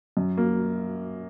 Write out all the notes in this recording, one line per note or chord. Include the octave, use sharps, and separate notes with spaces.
F#2
A#3